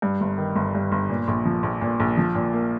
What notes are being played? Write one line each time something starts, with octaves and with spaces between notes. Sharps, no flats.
G2
G1
D#3
G1
G2
G1
A#2
A#1
F3
A#1
A#2
A#1
F3
A#2
A#3